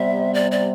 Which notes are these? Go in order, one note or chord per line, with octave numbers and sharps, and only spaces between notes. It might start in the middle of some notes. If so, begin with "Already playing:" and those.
Already playing: C3 G3 B3 E5
D5
D5